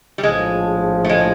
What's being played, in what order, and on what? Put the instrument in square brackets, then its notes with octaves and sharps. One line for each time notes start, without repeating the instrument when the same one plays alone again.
[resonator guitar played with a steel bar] G3
[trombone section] A#1 A2 F3 [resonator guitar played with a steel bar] G#3
[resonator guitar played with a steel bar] A3
G#3